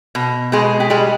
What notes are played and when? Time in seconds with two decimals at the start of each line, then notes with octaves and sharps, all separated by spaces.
0.15 B2
0.52 B2 G#3 G#4
0.80 G4
0.90 G3 G#3 G#4